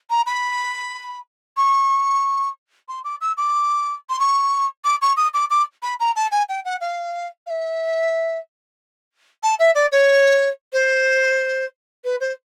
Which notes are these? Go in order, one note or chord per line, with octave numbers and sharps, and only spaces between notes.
A#5
B5
C#6
C6
D6
E6
D6
C6
C#6
D6
C#6
D#6
D6
D6
B5
A#5
A5
G#5
G5
F#5
F5
F5
E5
A5
E5
D5
C#5
C5
B4
C5